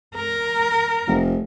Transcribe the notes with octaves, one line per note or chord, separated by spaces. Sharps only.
A#4
F1